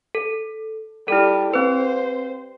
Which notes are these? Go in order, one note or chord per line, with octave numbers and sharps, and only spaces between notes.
A4
G3 E4 A4
C4 B4 C5